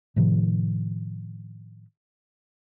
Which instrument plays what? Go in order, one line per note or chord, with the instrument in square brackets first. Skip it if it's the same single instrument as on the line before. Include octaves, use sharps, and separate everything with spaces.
[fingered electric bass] A2 C3 D#3 F3